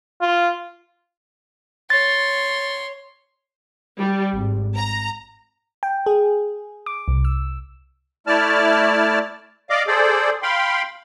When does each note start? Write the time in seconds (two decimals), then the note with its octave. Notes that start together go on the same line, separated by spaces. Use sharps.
0.22 F4
1.90 C#5 C6 A6
3.98 G3
4.35 G#1
4.75 A#5
5.83 G5
6.06 G#4
6.86 D6
7.08 C2
7.25 E6
8.27 A3 E4 D5 A5 F6
9.70 D5 D#5 F5 D6
9.88 G#4 A4 C5 D5
10.43 F5 G5 B5 C6